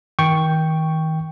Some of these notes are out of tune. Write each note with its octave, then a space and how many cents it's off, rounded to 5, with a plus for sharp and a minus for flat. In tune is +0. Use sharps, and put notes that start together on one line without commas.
D#3 +35 G5 +0 C#6 +0